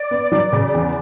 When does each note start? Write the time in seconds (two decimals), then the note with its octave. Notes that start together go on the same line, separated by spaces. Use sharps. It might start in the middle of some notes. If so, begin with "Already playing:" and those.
Already playing: D5
0.11 B3
0.32 F#3
0.53 C#3
0.74 E2